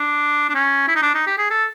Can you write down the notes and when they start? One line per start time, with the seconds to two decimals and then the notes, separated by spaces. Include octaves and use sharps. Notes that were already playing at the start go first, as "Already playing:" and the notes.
Already playing: D4
0.49 D4
0.55 C#4
0.88 E4
0.96 D#4
1.02 D4
1.15 D#4
1.26 G4
1.38 G#4
1.51 A4